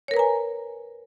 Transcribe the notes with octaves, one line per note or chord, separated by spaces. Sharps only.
A#4 B4 C#5 G#5 A#5